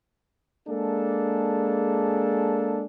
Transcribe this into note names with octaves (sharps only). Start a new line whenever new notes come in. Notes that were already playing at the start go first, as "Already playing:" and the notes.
G#3 A#3 D4 G#4 A4